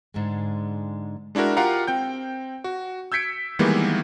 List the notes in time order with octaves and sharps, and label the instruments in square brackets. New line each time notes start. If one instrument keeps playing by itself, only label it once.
[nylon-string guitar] G#2 D3 G#3
[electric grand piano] G#3 D4 E4 F#4 A#4
F4 G4 A#4 F5 F#5 A#5
C4 G5 G6
F#4
E6 G6 G#6 B6 C#7 D7
D#3 E3 G3 G#3 A#3 B3